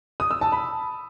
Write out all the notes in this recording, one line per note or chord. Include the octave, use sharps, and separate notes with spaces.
D#6
E6
A5
B5